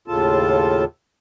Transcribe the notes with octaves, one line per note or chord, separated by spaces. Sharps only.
D#2 A2 C#3 F4 A4 A5